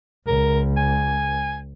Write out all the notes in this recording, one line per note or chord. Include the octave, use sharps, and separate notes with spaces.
C#2 A#4
G#5